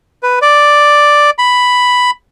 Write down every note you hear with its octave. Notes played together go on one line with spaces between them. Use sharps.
B4
D5
B5